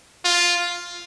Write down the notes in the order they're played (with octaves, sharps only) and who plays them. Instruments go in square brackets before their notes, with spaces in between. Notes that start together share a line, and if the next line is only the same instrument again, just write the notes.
[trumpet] F4